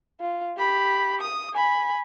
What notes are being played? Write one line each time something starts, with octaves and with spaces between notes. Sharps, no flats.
F4
G4 B5
D#6
G#5 B5